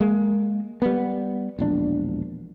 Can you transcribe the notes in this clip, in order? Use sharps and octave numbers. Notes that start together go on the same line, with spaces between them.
G#3 A#3
G3 B3
E1 A#1 D4